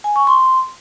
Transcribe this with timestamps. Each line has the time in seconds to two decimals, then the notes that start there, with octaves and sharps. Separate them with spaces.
0.04 G#5
0.16 C#6
0.27 C6